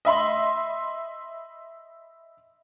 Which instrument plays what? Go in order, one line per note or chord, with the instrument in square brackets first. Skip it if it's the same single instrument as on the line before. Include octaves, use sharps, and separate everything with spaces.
[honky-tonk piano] D#5 E5 B5 C6